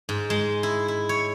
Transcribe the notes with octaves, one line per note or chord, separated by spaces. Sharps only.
G#2
G#3
E4
E4
C#5